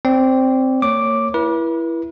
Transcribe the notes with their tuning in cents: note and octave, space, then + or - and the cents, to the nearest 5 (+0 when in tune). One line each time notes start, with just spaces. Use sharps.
C4 +0 D5 -20
A#3 -40 C#5 +0 D6 +0
E4 +15 B4 -40